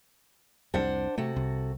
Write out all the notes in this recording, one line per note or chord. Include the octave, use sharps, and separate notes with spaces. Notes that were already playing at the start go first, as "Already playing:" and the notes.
C2 F2 D4 C5 F#5
C3 A3 F#4 A4
C2